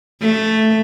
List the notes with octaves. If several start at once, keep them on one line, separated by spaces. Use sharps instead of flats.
A3